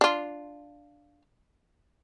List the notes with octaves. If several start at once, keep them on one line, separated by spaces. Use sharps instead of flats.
D4 F4